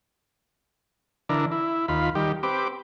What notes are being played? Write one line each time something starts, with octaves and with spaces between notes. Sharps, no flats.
D3 E3 D4 A#4
E4
D#2 F4 B5
D#3 G3 G4
C4 G4 B4 D6